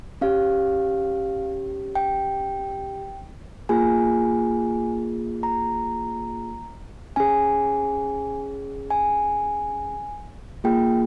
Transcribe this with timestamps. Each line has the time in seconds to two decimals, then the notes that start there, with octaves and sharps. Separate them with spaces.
0.21 C#4 G4 F5
1.95 G5
3.69 A#3 F4 G#4 G#5
5.43 A#5
7.16 C#4 G#4 G#5
8.90 G#5
10.64 A#3 F4 G#4 G5